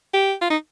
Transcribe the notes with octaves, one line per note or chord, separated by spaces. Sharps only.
G4
F4
D#4